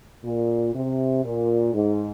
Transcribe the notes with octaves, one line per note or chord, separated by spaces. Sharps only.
A#2
C3
A#2
G#2